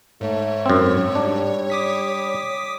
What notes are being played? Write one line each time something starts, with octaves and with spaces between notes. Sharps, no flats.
G#2 A3 C#5
F#2 C4
G3 D4
D6 D#6 B6